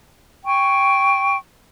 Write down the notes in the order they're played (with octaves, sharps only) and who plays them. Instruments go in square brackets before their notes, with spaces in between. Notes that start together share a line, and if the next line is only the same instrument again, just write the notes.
[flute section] G5 G#5 C#6